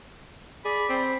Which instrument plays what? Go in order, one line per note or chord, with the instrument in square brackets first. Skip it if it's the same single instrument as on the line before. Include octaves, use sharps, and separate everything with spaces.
[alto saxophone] G#4 [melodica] D5 [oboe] B5
[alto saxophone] C4 [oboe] B5